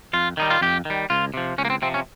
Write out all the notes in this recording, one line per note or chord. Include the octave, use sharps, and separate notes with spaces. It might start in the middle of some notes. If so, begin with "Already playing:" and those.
F2 F4
D#3 G3 D#4
F4
F2 G4
D#3 G3
C#2 F4
C3 F3
C#2 C#4
A#3
C4
C3 F3 C4
C#4